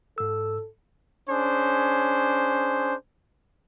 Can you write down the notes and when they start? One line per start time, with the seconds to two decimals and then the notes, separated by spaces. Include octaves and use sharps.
0.18 G#2 A4 E6
1.30 C#4 D4 G#4 C5